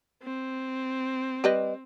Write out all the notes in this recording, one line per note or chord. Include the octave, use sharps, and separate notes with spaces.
C4
G3 B4 D#5